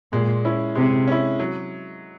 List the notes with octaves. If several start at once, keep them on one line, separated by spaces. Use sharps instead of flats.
A#2 G#3
C#4 E4
C3 G#3
C#4 E4
F#3